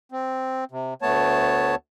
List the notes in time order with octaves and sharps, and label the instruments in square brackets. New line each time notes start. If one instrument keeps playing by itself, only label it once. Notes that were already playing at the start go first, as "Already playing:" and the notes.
[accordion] C4
C3
D2 A3 B3 C#5 A5